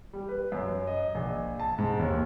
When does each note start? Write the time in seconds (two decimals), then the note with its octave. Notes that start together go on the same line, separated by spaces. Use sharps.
0.13 G3
0.29 B4
0.52 F#2
0.87 D#5
1.15 A#1
1.59 A5
1.78 G#2
1.99 D#2